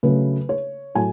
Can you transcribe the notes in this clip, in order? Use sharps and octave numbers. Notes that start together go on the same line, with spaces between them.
C#3 F#3 A3 B4
C#5
A2 F#3 A3 G#5